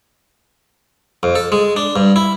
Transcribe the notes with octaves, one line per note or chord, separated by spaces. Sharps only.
F2
A4
G#3
D4
G2
E4